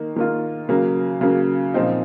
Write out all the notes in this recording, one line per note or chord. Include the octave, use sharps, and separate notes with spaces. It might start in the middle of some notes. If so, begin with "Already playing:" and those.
Already playing: D#3 A#3
D#3 A#3 F4
C#3 F#3 A#3
C#3 F#3 A#3
A#2 F3 C4 D#4